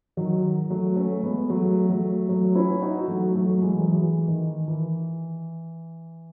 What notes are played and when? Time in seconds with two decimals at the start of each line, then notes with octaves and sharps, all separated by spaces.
0.17 D#3 F#3
0.70 F#3 A3
0.96 A3 C#4
1.23 G#3 B3
1.49 F#3 A3
1.89 F#3 A3
2.29 F#3 A3
2.55 C#4 E4
2.82 D#4 F#4
3.08 F#3 A3
3.35 F#3 A3
3.62 E3 G#3
3.80 F#3
3.88 E3
4.28 D#3
4.68 E3